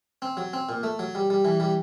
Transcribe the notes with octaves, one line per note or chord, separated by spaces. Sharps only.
C4
F#3
C4
A#2
A3
F#3
G3
G3
E3
G3